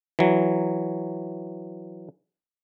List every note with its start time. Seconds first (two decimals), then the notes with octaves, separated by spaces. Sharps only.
0.19 E3 F#3